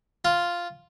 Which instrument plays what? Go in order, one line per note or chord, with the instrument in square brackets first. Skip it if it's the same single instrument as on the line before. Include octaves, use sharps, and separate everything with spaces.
[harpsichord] F4